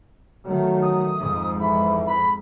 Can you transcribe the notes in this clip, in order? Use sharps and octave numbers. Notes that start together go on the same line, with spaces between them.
D#3 F#3 A3
D#6
F2 G#2
E3 B5
B5